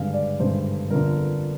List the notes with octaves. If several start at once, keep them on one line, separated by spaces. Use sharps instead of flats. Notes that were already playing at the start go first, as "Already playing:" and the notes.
Already playing: G#1 G2 D3 G#3 F5
D5
G#1 G2 D3 G#3 C5
G1 F2 D3 A#4